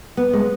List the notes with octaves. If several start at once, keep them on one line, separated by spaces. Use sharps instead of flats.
B3
G#3